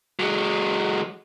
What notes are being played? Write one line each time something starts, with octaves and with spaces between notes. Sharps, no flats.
F#3 G#3